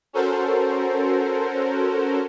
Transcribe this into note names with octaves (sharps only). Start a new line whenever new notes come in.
C#4 F#4 A4 A#4 C5